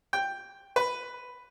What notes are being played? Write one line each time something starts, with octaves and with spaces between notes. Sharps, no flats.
G5
B4